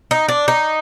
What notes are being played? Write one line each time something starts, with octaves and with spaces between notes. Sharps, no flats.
D#4
D4
D#4